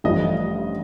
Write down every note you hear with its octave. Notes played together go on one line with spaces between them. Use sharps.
A1 G2 F3 A3 D#5